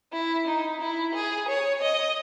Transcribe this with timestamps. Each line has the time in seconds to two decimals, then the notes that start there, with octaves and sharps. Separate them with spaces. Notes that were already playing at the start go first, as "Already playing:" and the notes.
0.13 E4
0.47 D#4
0.81 E4
1.14 G#4
1.49 C#5
1.82 D#5